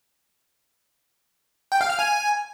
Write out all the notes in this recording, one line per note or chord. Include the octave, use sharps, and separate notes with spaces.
G5
F5
F6
G#5